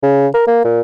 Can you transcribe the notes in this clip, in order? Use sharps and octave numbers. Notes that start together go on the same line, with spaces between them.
C#3
A#4
A#3
A#2